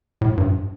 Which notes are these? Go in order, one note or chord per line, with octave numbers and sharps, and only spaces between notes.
A2
G2